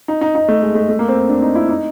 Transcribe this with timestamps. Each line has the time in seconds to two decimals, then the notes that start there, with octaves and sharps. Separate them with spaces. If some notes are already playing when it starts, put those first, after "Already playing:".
0.08 D#4
0.21 D#4
0.35 D#4
0.48 A3
0.62 G#3
0.75 A3
0.89 A3
0.99 A#3
1.08 C4
1.19 C4
1.29 D4
1.42 D#4
1.55 E4
1.69 D#4